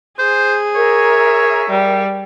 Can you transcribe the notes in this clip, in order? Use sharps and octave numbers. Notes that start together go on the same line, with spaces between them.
G#4 C5
A#4 C#5 E5
G3